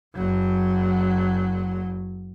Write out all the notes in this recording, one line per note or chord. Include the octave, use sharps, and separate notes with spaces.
F#1 F#3